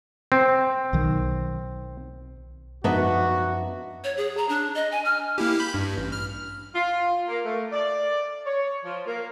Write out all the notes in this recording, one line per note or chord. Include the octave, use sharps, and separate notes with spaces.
C4
B1 D#3
F#2 F3 B3 D4 D#4 F#4 E5
C#5
G#4
A#5
D4
D#5
G#5
F6
A#3 E4 G4
B5 G6 B6
G2
A1
F6
F4
A#3
A3
D5
C#5
F3
A#3